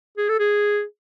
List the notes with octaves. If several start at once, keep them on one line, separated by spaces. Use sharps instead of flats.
G#4
A4
G#4